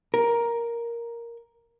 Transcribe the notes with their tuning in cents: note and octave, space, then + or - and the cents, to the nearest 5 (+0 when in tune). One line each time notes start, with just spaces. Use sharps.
A#4 +5